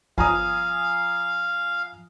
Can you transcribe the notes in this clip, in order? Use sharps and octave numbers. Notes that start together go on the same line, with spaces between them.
G1 F3 F5 G#5 A#5 D#6